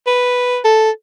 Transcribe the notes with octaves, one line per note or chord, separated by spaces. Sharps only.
B4
A4